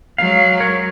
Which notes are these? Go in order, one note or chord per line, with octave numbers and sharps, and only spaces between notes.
F#3 G#3 F5
A#4 C#5